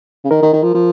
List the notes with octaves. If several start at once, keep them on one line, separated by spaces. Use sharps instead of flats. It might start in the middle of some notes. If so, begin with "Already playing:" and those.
C#3
D#3 A#4
D#3
D#3
F3
F3